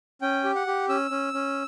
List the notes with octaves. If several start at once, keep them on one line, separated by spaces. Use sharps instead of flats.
C#4 G5
G4
F#5
G4
C#4 E6
C#4
C#4